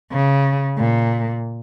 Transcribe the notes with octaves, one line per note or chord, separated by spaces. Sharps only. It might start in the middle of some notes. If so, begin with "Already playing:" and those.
C#3
A#2